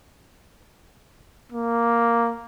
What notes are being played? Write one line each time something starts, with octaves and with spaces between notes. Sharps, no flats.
A#3